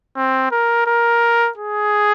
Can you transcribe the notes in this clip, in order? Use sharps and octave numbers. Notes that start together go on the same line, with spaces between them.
C4
A#4
A#4
G#4